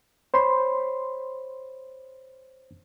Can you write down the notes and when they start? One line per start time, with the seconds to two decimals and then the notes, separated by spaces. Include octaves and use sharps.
0.34 C5 C#5 B5 C6